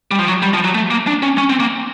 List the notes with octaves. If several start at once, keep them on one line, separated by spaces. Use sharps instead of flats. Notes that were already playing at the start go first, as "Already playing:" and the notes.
G3
F3
F#3
G3
F3
F#3
A3
A#3
D4
C#4
C#4
C4
A#3